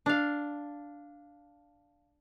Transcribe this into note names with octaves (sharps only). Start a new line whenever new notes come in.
D4 F5